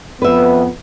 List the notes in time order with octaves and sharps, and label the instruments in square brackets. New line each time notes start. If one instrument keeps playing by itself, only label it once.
[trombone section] F2 B3 [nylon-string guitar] B4 E5